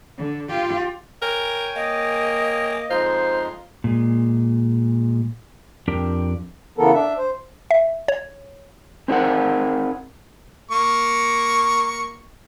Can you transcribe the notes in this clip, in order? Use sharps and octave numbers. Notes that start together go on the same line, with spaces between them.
D3
F4 G4
A#4 C#5 G5 G#5
A#3 D#5
F2 G#3 D#4 F4 C5
A#2 G#3
F2 C4 D4 G4 A#4 G5
C#3 E3 B3 A4 A#4
D4 E5
C5
E5
C#5
C4 D4 D#4 G#4 A#4 F#5
A#3 C#6